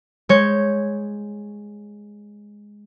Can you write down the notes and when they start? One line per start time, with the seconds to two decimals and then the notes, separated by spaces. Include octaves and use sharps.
0.29 G#3 C#5 G6